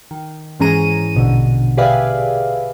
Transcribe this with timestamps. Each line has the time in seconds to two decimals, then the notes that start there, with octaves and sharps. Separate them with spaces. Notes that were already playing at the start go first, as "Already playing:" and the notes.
0.11 D#3
0.60 G#2 E3 C#4 G#4 A#5 D#7
1.15 A#1 B2 D3
1.77 G4 G#4 B4 D5 E5 F5